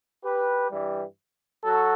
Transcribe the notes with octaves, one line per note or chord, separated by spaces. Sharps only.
G4 B4
G2 E3 G3
F#3 F#4 A4